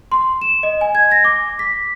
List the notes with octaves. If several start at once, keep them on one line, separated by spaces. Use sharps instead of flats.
C6
E7
D#5
G#5
G#6
A#6
D6
B6